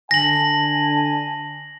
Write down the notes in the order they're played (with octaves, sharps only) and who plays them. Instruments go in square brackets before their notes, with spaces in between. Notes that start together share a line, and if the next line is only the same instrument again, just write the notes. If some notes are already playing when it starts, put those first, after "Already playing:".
[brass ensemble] D3 G#5 A5 [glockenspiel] A#6 F#7